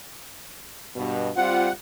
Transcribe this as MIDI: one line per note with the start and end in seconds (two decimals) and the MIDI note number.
0.96 1.29 43
0.96 1.29 47
1.36 1.69 55
1.36 1.69 60
1.36 1.69 65
1.36 1.73 78